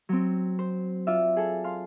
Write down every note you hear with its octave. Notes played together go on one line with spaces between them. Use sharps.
F#3 C4
C5
F4 D5 E5
G#4 A4
F5 C6